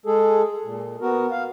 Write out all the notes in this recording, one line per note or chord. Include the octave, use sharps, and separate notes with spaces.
G#3 G#4 A4
A#2
B3 F#4 A#4
F5